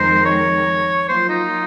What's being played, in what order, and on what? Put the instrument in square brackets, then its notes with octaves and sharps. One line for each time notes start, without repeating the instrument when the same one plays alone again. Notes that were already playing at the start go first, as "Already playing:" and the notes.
Already playing: [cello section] F2 D#3 G#3 D#4 A#4 [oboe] C5
[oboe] C#5
[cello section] F#3 A#3 F4 [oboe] C5
[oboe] D#4